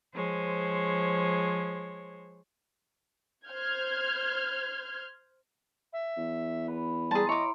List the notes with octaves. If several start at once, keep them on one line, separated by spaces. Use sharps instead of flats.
F3 G#3 C5 C#5
C5 F6 G6 G#6
E5
E2
B4
G3 G#4 A5 A#5 C6
E4 C#5 D#5 D6